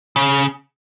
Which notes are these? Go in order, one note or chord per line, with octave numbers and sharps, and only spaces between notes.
C#3